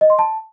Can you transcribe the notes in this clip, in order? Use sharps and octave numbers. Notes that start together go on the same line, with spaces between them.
D#5
C6
A5